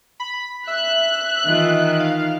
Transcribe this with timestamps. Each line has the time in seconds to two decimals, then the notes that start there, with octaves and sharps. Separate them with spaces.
0.20 B5
0.67 E5 F#6
1.45 D#3 E3 F4
2.00 F5